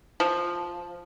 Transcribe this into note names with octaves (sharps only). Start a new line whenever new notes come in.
F3